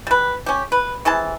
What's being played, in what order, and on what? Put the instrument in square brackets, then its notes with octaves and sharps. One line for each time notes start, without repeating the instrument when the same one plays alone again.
[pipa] G3 B4
C#4 G4
B4
C3 E3 G#4 A5